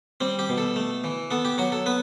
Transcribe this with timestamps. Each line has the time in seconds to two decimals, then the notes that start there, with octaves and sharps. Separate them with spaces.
0.21 G3 C4
0.39 G4
0.49 B2
0.58 A4
0.76 A3
1.04 E3
1.31 B3 A4
1.45 G4
1.58 F#3 F#4
1.72 A4
1.86 B3 B4